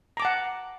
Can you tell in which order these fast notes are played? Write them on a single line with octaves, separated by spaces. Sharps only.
A#5 D6 A5 F#5